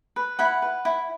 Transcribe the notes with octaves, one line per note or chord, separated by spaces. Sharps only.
B4
E4 F#5 B5
B4
E4